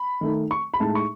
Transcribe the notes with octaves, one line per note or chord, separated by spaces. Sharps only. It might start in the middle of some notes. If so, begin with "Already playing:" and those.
Already playing: B5
D#3 A3 D#4
C#6
B5
A2 G#3 D#4 A5
C#6